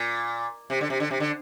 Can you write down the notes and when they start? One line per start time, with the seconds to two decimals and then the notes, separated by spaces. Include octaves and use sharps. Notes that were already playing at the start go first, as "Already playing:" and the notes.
Already playing: A#2
0.70 C3
0.81 D3
0.90 C3
1.00 D3
1.11 C3
1.20 D3